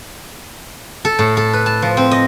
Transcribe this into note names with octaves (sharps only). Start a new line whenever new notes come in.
A4
A2
A4
B4
A5
F3
C4
D#5